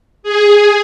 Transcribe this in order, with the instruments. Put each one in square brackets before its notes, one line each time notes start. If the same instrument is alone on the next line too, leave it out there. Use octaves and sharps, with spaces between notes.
[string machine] G#4